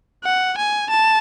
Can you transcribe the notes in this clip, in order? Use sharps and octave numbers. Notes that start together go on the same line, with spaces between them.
F#5
G#5
A5